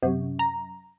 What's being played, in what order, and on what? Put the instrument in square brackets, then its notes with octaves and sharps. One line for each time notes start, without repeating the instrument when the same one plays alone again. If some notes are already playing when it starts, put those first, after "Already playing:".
[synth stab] F#2 [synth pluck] C3
[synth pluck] A#5